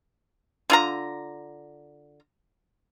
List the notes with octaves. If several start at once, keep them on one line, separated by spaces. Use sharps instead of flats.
D3 F4 A#5